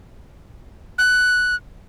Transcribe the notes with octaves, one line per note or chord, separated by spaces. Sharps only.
F#6